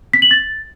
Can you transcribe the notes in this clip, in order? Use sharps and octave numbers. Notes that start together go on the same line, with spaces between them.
B6
F#7
A6